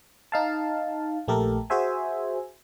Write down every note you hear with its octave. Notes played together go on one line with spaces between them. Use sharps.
D#4 F5 A5
A#1 A3 G4 A4 A#4
F#4 G#4 C5 E5 G#5